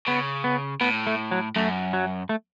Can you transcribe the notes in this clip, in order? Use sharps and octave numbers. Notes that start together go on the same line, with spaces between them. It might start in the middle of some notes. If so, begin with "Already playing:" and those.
C#3 B3
B3
A2 B3
A3
F#3
F#2 A3
F#3
A3